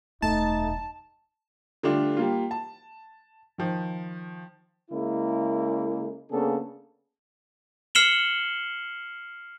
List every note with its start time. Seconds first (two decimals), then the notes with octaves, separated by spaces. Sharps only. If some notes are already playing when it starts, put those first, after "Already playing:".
0.22 E1 F#2 A3 D#4 A5
1.83 D3 G3 A3 D4 F4
2.17 G3 A#3 F4
2.51 A5
3.58 D#3 F3
4.91 C#3 G#3 A#3 E4
6.31 C#3 A#3 B3 D4 G#4 A4
7.95 F6 C7 C#7 E7 F#7 G7